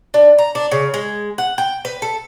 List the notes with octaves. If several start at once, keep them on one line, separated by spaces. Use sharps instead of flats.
D4
A#5
D4
C#3
G#3
F#5
G5
B4
A4